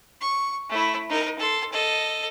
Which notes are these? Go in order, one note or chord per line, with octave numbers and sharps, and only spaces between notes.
C#6
A3 E4
D#4 A#4
A4 C6
A4 D#5